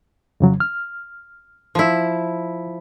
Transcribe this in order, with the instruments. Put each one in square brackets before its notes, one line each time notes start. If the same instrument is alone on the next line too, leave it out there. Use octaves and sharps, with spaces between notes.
[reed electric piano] F2 C#3 F#3
F6
[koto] F3 E4